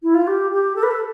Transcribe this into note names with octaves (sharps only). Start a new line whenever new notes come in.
E4
F4
G4
G4
A4
B4
A4